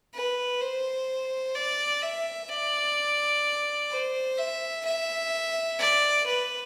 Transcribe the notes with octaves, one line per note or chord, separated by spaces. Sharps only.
B4
C5
D5
E5
D5
C5
E5
E5
D5
B4